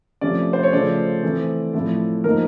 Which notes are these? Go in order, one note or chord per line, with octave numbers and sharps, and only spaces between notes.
C3 F3 A3 C#4 D5
C5
C#5
C#3 F3 A3 D5
E3 A3 C4
A2 F3 A3 C4 E4
F3 A#3 D#4 A#4